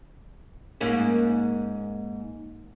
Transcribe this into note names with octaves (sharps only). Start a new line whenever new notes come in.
G#2 A#3 C#4